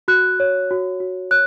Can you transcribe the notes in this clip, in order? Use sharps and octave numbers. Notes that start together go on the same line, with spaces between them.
F#4 F#6
C#5
F#4
F#4
C#5 F#6